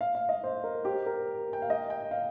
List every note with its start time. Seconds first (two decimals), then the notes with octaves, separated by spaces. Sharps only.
0.01 F5
0.15 F5
0.29 D#5
0.44 C5
0.64 A#4
0.85 G4
1.06 A#4
1.53 G5
1.62 F5
1.70 D#5
1.90 G5
2.11 F5